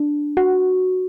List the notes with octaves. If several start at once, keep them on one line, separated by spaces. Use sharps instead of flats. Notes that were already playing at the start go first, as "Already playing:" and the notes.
Already playing: D4
F#4